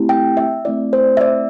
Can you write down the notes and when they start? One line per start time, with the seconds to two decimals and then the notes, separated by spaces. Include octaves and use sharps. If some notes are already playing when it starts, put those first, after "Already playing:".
Already playing: A3 C4 E4 G4
0.09 G5
0.37 E5
0.65 A3 C4 E4 D5
0.93 C5
1.17 E5
1.21 D5